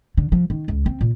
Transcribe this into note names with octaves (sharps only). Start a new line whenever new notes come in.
D3
F3
D#3
C#2
C4
A#2